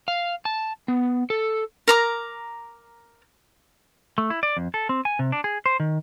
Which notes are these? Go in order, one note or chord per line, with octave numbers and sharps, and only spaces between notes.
F5
A5
B3
A4
A#4 A#5 D6
A3
E4
D5
F2
A4
C4
G#5
C3
D4
G#4
C5
D#3